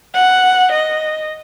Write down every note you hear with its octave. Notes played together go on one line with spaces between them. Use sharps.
F#5
D#5